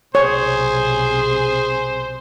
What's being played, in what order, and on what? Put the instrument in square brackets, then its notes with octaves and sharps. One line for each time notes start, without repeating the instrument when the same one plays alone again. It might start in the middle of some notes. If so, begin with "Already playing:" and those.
[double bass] B1 C3 [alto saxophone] G#4 [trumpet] C5 [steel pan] C#5